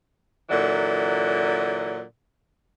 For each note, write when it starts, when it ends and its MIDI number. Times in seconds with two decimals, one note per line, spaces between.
0.50 2.02 46
0.50 2.02 50
0.50 2.02 52
0.50 2.02 54